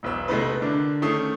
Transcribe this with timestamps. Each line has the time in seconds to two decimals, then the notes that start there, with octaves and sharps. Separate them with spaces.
0.03 E1 B1 B4 E6
0.28 C3 G#3 A3 B3 D#4 B4
0.61 D3 D4 A#4
1.02 D#3 A3 C#4 D#6 C7